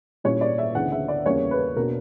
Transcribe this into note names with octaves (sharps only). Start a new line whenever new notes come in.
A#2 G3 C#4 E4 C#5
D5
E5
D2 C#3 E3 B3 F#5
E5
D5
E2 C#3 G3 A#3 C#4 C#5
B4
B2 A#3 D4 A#4